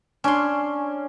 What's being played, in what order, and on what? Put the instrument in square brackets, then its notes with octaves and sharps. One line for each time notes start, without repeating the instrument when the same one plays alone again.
[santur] C#4 [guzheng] D4 C6